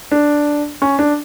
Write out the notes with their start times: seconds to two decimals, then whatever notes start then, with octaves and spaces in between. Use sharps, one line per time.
0.12 D4
0.82 C#4
0.99 D4